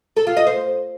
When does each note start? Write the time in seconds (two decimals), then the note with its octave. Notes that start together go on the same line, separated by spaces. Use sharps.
0.17 A4
0.27 F4
0.37 D#5
0.47 C5